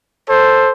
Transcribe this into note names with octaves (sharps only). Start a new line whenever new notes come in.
A4 C5